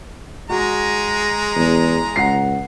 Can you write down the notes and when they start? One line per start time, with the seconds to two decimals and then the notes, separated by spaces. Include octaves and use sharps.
0.50 G#3 F#4 A#5
1.56 E2
2.16 C#2 F#5 C7